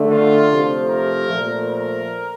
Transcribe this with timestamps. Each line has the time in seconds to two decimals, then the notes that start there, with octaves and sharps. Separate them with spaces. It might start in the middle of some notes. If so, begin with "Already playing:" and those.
Already playing: D3 A3
0.10 F4
0.50 C3 F3 A3
0.90 A#4
1.29 A#2 F3 A3
1.69 A#4